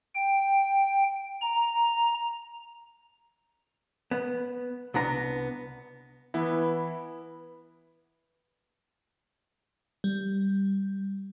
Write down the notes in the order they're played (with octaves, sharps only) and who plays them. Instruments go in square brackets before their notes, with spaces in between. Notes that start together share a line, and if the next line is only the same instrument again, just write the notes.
[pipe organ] G5
A#5
[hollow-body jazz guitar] B3
C2 B3 D4 A#5
[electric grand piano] E3 E4 [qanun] B3
[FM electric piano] G3